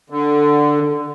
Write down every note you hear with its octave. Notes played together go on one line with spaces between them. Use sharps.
D3